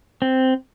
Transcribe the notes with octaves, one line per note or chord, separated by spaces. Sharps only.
C4